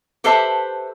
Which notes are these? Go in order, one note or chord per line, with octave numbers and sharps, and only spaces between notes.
G4 A4 B4 C5 E5 A5